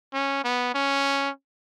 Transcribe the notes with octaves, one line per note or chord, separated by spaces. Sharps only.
C#4
B3
C#4